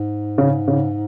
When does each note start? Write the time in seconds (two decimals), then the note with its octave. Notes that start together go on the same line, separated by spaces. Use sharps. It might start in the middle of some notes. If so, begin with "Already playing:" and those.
Already playing: G#2
0.38 C#3
0.68 C#3